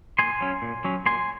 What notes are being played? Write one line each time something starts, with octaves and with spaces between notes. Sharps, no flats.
A#2 G#5 C6
F#3 C#4
A#2
F#3 C#4
A#2 G#5 C6